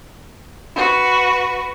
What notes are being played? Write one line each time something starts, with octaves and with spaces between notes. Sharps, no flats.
F#4 B4